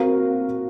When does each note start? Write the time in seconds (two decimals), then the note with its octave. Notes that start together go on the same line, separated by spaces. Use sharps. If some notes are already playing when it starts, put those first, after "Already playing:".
Already playing: C4 F#4 A#4 F5